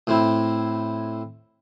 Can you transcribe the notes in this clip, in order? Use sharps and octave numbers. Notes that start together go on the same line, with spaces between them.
A2 C4 E4